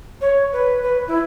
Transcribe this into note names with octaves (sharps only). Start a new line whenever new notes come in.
C#5
B4
B4
E4